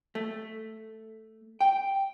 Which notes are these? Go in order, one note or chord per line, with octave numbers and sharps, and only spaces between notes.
A3
G5